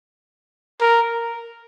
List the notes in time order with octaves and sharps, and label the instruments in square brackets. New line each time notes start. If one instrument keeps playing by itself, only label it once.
[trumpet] A#4